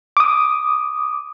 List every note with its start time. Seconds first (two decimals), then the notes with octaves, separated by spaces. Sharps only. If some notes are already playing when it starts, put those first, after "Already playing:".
0.17 D6 D#6